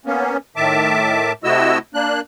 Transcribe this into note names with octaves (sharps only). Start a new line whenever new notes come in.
A#3 B3 C#4
A2 D#3 E5 A5 D6
C3 A3 E4 F#4 D#5 E6
A#3 D4 F#6